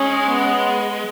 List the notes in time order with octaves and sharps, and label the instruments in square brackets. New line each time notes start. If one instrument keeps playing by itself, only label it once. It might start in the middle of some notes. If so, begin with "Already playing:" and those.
Already playing: [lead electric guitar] G#3 [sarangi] C#4
[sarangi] B3